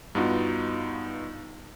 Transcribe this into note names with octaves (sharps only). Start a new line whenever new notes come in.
G2 B3 D#4 F4 F#4